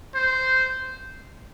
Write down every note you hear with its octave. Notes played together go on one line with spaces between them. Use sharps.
C5